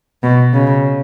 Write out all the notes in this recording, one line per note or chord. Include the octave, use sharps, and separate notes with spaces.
B2
C#3